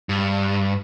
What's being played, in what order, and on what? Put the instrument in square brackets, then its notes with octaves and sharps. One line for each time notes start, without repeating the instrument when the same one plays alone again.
[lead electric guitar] G2